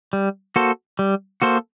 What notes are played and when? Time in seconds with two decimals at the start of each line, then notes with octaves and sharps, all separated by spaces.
0.13 G3
0.56 A#3 F#4 A4 C5
0.99 G3
1.42 A#3 F#4 A4 C5